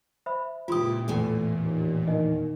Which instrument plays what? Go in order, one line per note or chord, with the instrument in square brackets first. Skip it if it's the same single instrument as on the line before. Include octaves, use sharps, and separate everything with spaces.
[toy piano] C5 E5 B5
[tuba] C#2 [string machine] A#2 [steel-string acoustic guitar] E4 G4 [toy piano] F4 C6 D#6
[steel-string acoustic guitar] E2 A2 G#5 [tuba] A3
[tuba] D#2
[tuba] D#3 [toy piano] D#4 D#5